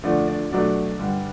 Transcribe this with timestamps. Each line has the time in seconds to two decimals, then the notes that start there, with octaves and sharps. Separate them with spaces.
0.04 F2 D3 F3 A3 D4 D5
0.28 D4 D5
0.51 B2 F#3 A3 D4 D5
0.99 G2 D3 G3